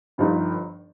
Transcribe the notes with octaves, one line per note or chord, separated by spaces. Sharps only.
G1 G2 F3 D#4 G4